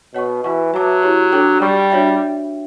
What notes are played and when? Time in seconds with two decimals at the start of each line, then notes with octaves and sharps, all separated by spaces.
0.14 B2 C#5 F#5 C#6
0.44 E3 F#4 B4 F#5 C#6
0.73 F#3 B4 E5 A5 D6
1.02 E4 G4 C#5
1.32 D4 A4 C#5 G5 D6
1.61 G3 G4 D5 G5 C#6
1.90 D4 F#4 C#5 E5 G5